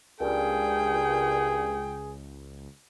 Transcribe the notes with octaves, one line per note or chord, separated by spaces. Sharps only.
C#2 G2 A#2 G#4 G5